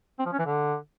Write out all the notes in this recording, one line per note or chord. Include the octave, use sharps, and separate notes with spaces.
C4
F3
C#4
E3
D3